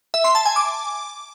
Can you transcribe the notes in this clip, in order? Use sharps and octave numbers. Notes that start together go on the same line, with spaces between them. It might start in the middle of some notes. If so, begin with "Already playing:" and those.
E5
C6
A5
G#5
D6